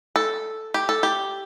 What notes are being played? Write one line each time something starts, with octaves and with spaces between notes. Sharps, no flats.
A4
G4
A4
G4